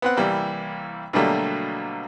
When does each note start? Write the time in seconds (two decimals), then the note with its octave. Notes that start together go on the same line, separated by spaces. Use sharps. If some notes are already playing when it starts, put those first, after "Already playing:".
0.02 B3 C4 F#5
0.17 C2 E3 G3 A#3
1.13 B2 D3 F#3 G3 A3 A#3